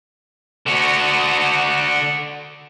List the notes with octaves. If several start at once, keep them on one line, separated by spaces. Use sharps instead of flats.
D3 F#4